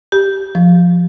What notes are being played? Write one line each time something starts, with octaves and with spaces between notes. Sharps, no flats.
G4
F3